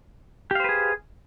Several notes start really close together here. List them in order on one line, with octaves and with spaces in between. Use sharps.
G4 F5 C5 B4 G#4